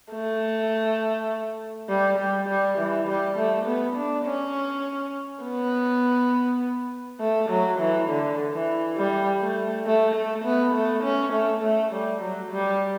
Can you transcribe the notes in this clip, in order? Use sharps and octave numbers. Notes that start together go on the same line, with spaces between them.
A3
G3
G3
G3
E3
G3
A3
B3
D4
C#4
B3
A3
F#3
E3
D3
E3
G3
A3
A3
A3
B3
A3
C#4
A3
A3
G3
F#3
G3